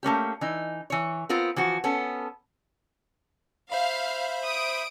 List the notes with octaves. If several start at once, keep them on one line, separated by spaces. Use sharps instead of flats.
A3 A#3 C#4 G4
E3 D#4
E3 C#5
B3 C4 F4 A#4
E3 F3 F#4
B3 C#4 A4
C5 E5 F5 B5
D#6 D7